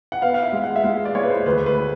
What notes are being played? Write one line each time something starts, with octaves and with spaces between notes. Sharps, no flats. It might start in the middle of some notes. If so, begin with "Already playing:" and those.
F#5
B3 F5
F5
E5
G#3
F#5
E5
G#3 F5
D5
G#3 C#5
B4
C5
D2 B4
B4